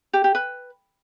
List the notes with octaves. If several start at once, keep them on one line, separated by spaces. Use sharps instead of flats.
G4
G4
B4